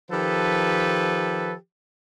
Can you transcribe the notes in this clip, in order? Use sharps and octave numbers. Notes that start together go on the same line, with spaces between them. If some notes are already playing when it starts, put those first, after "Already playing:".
D#3 F3 G4 A4 B4